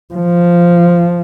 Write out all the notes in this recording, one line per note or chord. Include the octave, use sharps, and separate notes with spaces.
F3